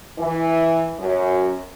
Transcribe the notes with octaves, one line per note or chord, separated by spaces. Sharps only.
E3
F#2